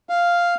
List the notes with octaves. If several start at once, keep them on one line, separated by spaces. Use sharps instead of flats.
F5